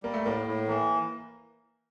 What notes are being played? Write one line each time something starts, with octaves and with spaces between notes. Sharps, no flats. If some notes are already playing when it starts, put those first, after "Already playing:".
G3 A#3
A3
A2 A#3
A2
E3 A#3